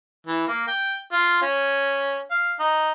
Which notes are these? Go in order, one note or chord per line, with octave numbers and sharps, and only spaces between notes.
E3
A#3
G5
F4
C#4
F5
D#4